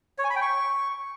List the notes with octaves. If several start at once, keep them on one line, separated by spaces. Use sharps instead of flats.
C#5
G#5
B5
G5
C#6